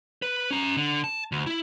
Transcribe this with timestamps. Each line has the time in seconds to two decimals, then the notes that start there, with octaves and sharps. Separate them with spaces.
0.22 B4
0.51 C#4 A#5
0.77 D3
1.04 A5
1.32 D2
1.46 E4